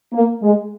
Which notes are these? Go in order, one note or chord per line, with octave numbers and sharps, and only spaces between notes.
A#3
G#3